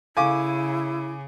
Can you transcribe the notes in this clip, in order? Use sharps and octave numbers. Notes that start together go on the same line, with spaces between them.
C#3 E4 A4 F5 G#5 C#6 D6